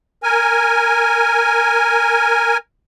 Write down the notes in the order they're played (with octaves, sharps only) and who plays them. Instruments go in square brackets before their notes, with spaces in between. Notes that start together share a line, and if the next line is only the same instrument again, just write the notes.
[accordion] A#4 G#5